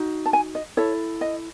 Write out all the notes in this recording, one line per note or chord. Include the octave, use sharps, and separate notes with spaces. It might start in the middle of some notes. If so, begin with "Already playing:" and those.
Already playing: D#4 F#4
A5
G#5
D#5
E4 A4 C#5
D#5